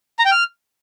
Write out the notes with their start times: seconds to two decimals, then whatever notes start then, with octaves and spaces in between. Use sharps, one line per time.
0.19 A#5
0.25 G5
0.31 F6